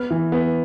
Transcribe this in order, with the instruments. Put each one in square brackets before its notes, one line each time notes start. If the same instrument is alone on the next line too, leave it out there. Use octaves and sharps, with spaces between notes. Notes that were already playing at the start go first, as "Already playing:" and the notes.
Already playing: [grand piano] B3 F6
E3
B3